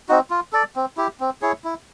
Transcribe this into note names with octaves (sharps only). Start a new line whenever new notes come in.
C4 D#4 F#4
F4
A4 D5
C4
E4 G4
C4
E4 G#4 C#5
E4